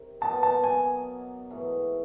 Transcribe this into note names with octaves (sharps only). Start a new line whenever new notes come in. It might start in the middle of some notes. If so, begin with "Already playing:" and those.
Already playing: C3 D#3
B2 F#3 A#3 D#4 A5
A5
G#5
G#2 E3 A3